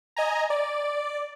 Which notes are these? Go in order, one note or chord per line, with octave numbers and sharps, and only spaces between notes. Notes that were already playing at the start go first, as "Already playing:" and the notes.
D#5 G#5 A#5
D5